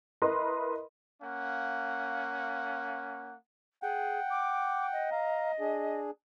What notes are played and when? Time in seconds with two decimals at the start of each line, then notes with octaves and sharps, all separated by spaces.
0.22 E4 A#4 B4 D#5 C6
1.22 A#3 C#4 F5 F#5
3.83 G#4 F#5 G5
4.30 D6
4.92 D#5
5.12 F5 A#5
5.60 D4 G#4